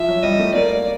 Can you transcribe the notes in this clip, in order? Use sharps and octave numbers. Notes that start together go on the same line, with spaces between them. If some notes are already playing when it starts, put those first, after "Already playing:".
Already playing: F3 E5
F#3
G3 D#5
A3
A#3 D5